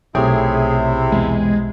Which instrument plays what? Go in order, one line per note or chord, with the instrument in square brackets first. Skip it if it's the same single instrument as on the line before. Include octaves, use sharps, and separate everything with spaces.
[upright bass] B1 [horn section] C3 E4 [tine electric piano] A3 C#5 G5 [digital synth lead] G#4
[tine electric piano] E2 [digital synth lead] G#3